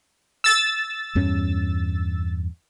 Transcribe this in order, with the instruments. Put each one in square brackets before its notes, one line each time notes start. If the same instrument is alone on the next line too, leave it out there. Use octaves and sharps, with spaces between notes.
[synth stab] E6 A6
[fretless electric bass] E2 G2 C#4